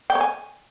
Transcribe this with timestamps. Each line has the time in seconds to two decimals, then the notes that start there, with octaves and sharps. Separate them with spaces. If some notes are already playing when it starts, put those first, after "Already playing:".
0.10 G5
0.15 C#5
0.21 G#5